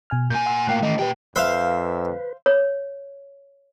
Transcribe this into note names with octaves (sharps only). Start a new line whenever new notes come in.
B2 G#5 F6
A#2 G#5 G6
F#5 C6 E6
A2 A#3 F5 G5 F#6
D#3 E3 A3 D#5
A#2 G4 B4 G5
F2 B4 C5 E5 F5 B5
C#5